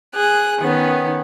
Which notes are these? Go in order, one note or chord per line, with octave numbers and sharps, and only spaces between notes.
G#4 F#6
D#3 B3 C#4